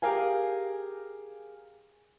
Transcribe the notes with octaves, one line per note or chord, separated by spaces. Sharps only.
G4 G#4 A#4 F5 G#5